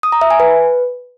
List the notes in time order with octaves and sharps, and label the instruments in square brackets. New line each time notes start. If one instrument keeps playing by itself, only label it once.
[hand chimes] D#6
A#5
E5
G#5
B4